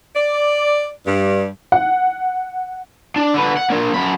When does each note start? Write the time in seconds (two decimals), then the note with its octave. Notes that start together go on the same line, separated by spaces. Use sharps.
0.16 D5
1.07 G2
1.72 F#5
3.16 D4
3.34 D3 B4
3.57 F#5
3.70 A#3 D4
3.94 F#2 B5